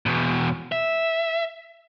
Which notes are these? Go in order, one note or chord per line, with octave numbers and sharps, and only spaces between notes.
E2 B2
E5